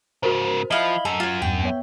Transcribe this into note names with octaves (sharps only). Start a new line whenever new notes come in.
G#2 C#3 F#4 A#4 C5
F3 E4 D#5 F5 B5 F#7 G7
F#2 A4
F4 C#5
E2 G2 G5
B3 C#5 E5